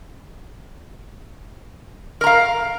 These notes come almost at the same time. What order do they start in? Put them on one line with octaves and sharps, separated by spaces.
A#4 A#5 F5